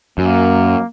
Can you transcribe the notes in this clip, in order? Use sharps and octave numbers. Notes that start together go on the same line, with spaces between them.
F#2 A#3